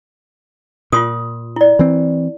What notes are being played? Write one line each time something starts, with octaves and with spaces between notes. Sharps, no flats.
A#2 F4 C6 D#6
E4 D5
E3 C4